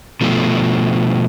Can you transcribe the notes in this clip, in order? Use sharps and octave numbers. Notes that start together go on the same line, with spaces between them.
B2 F3 A3